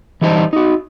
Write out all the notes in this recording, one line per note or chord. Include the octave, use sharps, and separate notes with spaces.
E3 G3 D#4 C5 A5
D#4 F#4